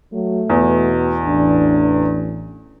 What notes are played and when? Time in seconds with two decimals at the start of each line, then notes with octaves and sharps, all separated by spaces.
0.13 F#3 A3
0.50 E2 B2
1.25 A1 D4